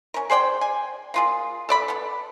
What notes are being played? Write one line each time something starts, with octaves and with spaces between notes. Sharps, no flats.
C#4 A#4
G#4 C5 D5 G5
G#5
A#3 F4 G#4
A4 D5 B5
B3 A4